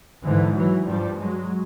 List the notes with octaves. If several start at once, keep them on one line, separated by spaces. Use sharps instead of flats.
G#2 D3 E3
E3 F#3
G2 F3 G3
F#3 G#3